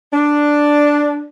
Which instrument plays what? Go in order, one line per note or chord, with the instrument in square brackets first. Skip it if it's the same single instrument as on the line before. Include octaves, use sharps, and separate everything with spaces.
[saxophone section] D4